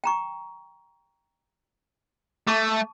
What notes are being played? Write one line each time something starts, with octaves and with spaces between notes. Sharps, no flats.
G5 A#5 C#6
A3 A5 C#6 D6